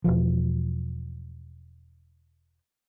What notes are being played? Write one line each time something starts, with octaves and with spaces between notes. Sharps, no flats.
E1 C2 F3